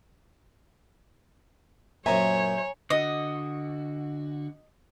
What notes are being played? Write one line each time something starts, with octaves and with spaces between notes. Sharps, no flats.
F#2 A#2 C5 C#5 E5 G#5 A#5
D3 F#4 D#5